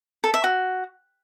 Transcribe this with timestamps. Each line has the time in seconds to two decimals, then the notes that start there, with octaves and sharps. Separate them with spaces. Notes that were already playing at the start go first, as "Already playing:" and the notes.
0.24 A4
0.34 E5
0.44 F#4